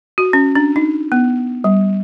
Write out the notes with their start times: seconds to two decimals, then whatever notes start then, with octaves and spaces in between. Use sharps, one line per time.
0.18 F#4
0.33 C#4
0.55 D4
0.76 D#4
1.12 B3
1.64 G3